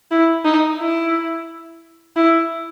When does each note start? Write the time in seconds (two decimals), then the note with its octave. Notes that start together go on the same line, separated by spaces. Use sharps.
0.11 E4
0.45 D#4
0.80 E4
2.16 E4